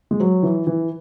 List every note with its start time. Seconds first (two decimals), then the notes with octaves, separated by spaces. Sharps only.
0.11 G#3
0.20 F#3
0.43 E3
0.67 E3